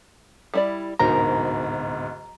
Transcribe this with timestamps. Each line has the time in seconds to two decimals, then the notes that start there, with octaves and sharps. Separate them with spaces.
0.54 G3 E4 D5
0.99 D1 G#2 B2 A#4 C5 A#5